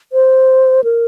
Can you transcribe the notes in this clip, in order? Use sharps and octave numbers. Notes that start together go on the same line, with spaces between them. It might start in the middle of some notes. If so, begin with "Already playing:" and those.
C5
A#4